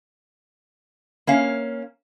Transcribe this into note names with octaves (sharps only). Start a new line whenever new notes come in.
A#3 C#4 F5